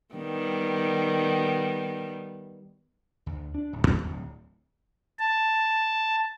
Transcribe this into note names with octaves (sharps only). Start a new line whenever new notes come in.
D#3 G3 B3
D2
D4
D1
D#2
D1
A5